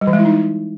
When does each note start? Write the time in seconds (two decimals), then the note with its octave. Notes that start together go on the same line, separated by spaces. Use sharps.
0.01 G3
0.07 E3
0.13 G#3
0.19 E4
0.25 D#4